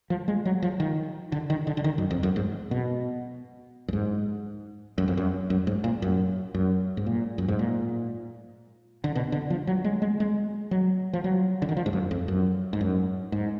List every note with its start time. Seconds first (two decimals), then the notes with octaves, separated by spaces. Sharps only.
0.10 F3
0.28 G#3
0.45 F#3
0.62 F3
0.80 D#3
1.32 D3
1.50 D#3
1.67 D3
1.77 D3
1.84 D#3
1.98 F#2
2.11 F2
2.23 F#2
2.36 G#2
2.71 B2
3.88 F#2
3.93 G#2
4.98 F#2
5.08 F2
5.17 F#2
5.50 F#2
5.67 G#2
5.84 A#2
6.02 F#2
6.54 F#2
6.97 G#2
7.06 A#2
7.38 F#2
7.48 G#2
7.59 A#2
9.04 D3
9.15 B2
9.32 D3
9.50 F3
9.67 F#3
9.84 G#3
10.02 G#3
10.20 G#3
10.71 F#3
11.13 F3
11.24 F#3
11.62 D3
11.69 D#3
11.77 F3
11.86 G#2
11.93 F#2
12.11 F2
12.28 F#2
12.73 G#2
12.81 F#2
13.32 G#2